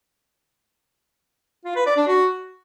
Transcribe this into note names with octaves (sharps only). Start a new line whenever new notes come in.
F4
B4
D5
D4
F#4